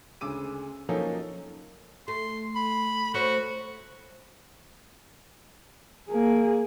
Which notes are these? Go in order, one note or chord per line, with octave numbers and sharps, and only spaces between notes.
D2 C#3 G#3 D6 E6 D#7
F3 F#3 A#3 C#4 D#4 A4
A3 C6
B5
A3 F#4 C5 C#5
A#3 G#4